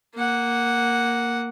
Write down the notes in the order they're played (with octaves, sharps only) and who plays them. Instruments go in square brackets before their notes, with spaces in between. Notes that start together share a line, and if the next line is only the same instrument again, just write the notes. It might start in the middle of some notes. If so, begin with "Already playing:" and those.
[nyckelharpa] A#3 F#5